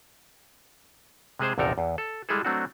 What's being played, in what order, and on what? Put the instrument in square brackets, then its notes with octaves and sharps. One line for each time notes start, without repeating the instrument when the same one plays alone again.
[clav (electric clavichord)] C3 G#3 G#4 C5
A#1 E2 C3 D#4 A4 A#4
E2
A4
G3 G#3 E4 G#4 A4
F#3 A3 C4 D4 F#4